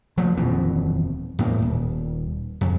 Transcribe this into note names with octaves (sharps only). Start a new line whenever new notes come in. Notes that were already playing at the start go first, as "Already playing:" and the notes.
F3 A3 A#3
D#1 F2 B2 E3
E2 A2 A#3
D#1
F2